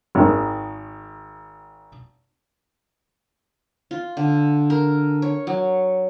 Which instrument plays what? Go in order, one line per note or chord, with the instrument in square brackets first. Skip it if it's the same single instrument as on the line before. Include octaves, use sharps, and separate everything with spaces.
[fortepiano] G#1 D#3
[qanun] F4
D3
A#4
C#5
F#3